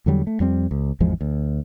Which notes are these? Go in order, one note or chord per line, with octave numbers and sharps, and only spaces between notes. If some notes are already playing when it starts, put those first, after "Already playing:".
E2 D3 F#3 G3
A3
F2 G3 C4
C#2
G#1 E2 F3 G#3
D2